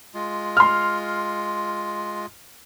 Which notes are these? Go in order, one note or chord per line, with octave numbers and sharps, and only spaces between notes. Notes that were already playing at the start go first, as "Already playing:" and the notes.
G#3 F4
C6 F6